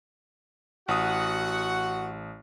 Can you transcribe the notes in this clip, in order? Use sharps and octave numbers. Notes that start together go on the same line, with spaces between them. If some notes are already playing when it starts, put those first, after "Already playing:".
A1 F#4 F#5 D#6